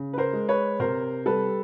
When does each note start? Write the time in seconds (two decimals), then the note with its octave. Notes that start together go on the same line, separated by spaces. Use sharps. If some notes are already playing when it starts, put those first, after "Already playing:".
Already playing: C#3
0.13 B4
0.18 A#4 C5
0.33 G#3
0.48 B4 C#5
0.79 C3 A#4 C5
1.26 G3 A4 B4